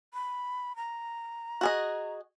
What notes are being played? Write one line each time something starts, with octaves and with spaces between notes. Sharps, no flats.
B5
A#5
F#4 G#4 D#5